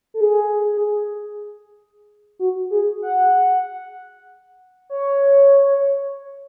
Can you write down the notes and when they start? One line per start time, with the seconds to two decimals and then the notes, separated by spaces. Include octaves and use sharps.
0.14 A4
0.21 G#4
2.39 F#4
2.70 G#4
3.02 F#5
4.90 C#5